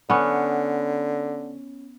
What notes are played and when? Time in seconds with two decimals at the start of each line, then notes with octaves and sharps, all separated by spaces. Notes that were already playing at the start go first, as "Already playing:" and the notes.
0.10 D3 B3 C#4